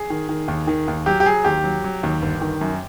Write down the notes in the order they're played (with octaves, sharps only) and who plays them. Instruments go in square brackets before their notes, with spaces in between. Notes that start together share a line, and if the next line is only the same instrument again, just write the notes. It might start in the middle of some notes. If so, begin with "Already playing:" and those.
Already playing: [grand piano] G#4
D#3
D#3
D#2
D#3
D#2
F#3 G4
G4
F#3 G#4
D#2 G4
F#3
F#3
D#2
G1
D#3
F#2